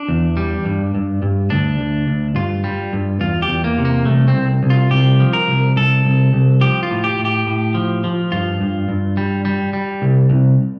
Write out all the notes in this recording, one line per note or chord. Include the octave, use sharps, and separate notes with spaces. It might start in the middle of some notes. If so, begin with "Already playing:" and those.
Already playing: D4
E2
G3
G2
G2
G2
D2 D4
D2
D2
G2 F4
G3
G2
E2 F4
G4
E2
A#3
C3
A#3
C2 A3
C4
C2
C2
F4
C2 G4
F3
A#4
C2
C2 A4
C2
C2
F3 G4
F4
A2
G4
A2
G4
A2
F3
F3
G2 F4
G2
G2
G3
G3
G3
C2
C2